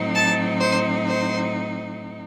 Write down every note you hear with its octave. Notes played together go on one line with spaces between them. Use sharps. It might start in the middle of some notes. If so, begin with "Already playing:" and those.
Already playing: A2 F#3 C4 D#4
A5
C5
C5